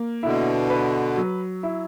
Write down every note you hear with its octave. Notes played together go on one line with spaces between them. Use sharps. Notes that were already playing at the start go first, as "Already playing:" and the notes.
Already playing: A#3
B2 D3 E4
B4
F#3
E4